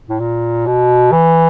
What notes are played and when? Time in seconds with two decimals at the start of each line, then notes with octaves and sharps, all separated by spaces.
0.09 A2
0.20 A#2
0.66 B2
1.12 E3